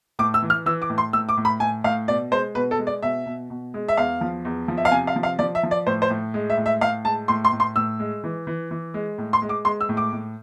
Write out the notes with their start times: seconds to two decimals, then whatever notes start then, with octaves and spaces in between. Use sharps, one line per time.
0.19 A2 D6
0.34 E6
0.42 E3
0.50 F6
0.66 E3 E6
0.82 D6
0.90 A2
0.98 C6
1.13 A2 E6
1.29 D6
1.37 A2
1.45 B5
1.60 A2 G#5
1.84 A2 F5
2.08 B2 D5
2.32 G#3 C5
2.55 B2 B4
2.71 A4
2.79 G#3
2.87 D5
3.03 B2 E5
3.26 B2
3.50 B2
3.74 G#3
3.88 E5
3.97 E2 F5
4.21 F3
4.45 E2
4.68 F3
4.77 E5
4.85 F5
4.91 C3 G#5
5.07 F5
5.16 F3
5.23 F5
5.39 F3 D5
5.55 E5
5.63 F3
5.71 D5
5.87 A2 C5
6.02 C5
6.10 A2
6.34 G#3
6.50 E5
6.57 A2
6.66 E5
6.81 A2 F5
7.05 G#3 A5
7.28 A2 C6
7.45 C6
7.52 A2
7.60 C6
7.76 A2 E6
7.99 G#3
8.24 E3
8.47 E3
8.71 E3
8.94 G#3
9.18 A2
9.33 C6
9.42 G#3
9.49 D6
9.65 G#3 C6
9.81 E6
9.89 A2
9.97 D6
10.13 A2